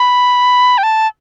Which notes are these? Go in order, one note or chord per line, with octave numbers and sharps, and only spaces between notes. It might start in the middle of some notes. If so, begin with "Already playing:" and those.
Already playing: B5
G5
A5